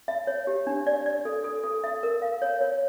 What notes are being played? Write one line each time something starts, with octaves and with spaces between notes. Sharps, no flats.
E5
C#5
G4
D4
D5
D5
A4
A4
A4
E5
A#4
F5
C#5
C#5